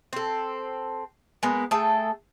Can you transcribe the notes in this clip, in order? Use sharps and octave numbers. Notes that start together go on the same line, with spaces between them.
C4 A4
G#3 A#3 B3
A3 G#4 A4 G5